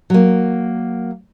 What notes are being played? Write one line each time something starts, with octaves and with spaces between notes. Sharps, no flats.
F#3 A#3